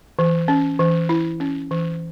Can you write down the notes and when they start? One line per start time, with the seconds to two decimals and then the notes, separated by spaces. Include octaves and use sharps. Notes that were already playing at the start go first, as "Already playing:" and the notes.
0.19 E3
0.48 C#4
0.79 E3
1.09 E4
1.40 C#4
1.71 E3